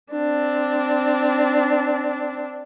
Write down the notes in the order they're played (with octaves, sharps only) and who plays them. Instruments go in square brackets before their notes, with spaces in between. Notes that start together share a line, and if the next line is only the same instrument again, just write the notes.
[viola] C4 D4